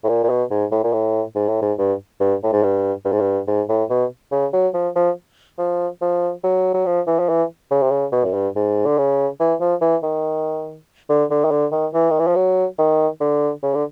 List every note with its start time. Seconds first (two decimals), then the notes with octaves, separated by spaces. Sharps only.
0.04 A2
0.09 A#2
0.24 A#2
0.29 B2
0.51 G#2
0.72 A2
0.84 A#2
0.93 A2
1.35 G#2
1.48 A2
1.62 G#2
1.79 G2
2.20 G2
2.44 A2
2.53 G#2
2.63 G2
3.05 G2
3.12 G#2
3.20 G2
3.48 G#2
3.69 A2
3.90 B2
4.32 C#3
4.53 F#3
4.74 F3
4.95 F3
5.58 F3
6.01 F3
6.44 F#3
6.74 F#3
6.86 F3
7.07 E3
7.19 F3
7.29 E3
7.71 C#3
7.82 C3
7.91 C#3
8.12 B2
8.24 F#2
8.34 G2
8.56 G#2
8.85 D3
8.98 C#3
9.40 E3
9.60 F3
9.81 E3
10.03 D#3
11.09 D3
11.31 D3
11.45 D#3
11.51 D3
11.72 D#3
11.94 E3
12.11 D#3
12.19 E3
12.27 F3
12.36 F#3
12.78 D#3
13.21 D3
13.63 C#3
13.74 D3